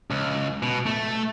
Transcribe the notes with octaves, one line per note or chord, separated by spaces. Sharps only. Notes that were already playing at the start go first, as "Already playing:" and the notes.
C#2
B2
A3